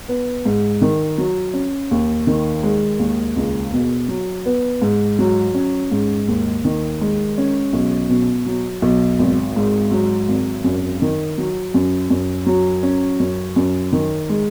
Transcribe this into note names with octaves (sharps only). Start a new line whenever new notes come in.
B3
G#2
D#3
F#3
C#4
D#2
D#3
G#3
D#2
C#2
B2
F#3
B3
G#2
F#3
C#4
G#2
D#2
D#3
G#3
C#4
B1
B2
F#3
B1
G#1
G#2
F#3
G#1
F#2
D#3
F#3
F#2
F#2
F#3
C#4
F#2
F#2
D#3
G#3